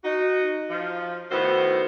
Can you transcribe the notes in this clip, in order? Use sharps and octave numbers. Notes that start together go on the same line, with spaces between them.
D#4 F#4
F3
A2 D#3 B3 F#4 C5